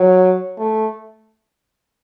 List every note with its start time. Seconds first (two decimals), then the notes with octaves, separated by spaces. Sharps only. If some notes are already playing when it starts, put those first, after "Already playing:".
Already playing: F#3
0.58 A3